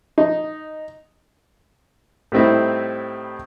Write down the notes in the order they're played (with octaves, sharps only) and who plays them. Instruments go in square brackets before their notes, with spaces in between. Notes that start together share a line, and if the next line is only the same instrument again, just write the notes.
[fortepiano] D#4
A2 G3 A3 C4 D#4 E4